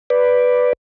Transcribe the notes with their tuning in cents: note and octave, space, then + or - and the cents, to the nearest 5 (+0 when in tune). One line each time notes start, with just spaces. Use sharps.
B4 +0 D5 +0